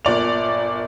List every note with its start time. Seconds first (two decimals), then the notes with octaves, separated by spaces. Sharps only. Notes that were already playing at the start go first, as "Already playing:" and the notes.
0.05 G1 A#2 D5 F7